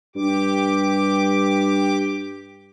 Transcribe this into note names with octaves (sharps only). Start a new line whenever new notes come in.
G2 G4 D6